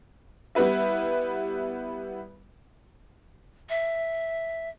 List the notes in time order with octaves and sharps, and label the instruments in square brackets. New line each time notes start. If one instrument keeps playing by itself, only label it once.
[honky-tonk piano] G3 B3 E4 B4 E5
[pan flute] E5